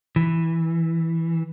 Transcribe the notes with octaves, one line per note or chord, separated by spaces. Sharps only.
E3